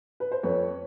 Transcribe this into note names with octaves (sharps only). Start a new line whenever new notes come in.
B4
C5
F2 B4 C#5